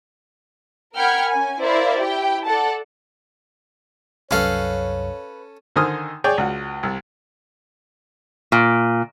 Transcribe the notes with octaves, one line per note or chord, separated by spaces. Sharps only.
A#4 F#5 G5 B5 F6 G#6
C#4 G#5
E4 A#4 C5 D5 E5 F5
E4 G4 G5
A4 D5 F#5 A5
C2 F#2 C#4 A4 B4 C#5 F5
D3 D#3 C5 G#5 D#6 F6
G#4 C#5 D5 G5
C#2 F#4
C2
A#2